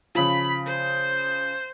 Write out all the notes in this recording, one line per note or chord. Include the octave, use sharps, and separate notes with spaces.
C#3 F3 B5
C5